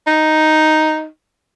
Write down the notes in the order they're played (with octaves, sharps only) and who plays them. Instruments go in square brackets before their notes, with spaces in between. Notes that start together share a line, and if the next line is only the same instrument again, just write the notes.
[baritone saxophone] D#4